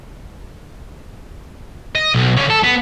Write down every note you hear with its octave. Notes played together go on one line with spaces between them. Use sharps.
D#5
B1
D3 C#4
A4
B3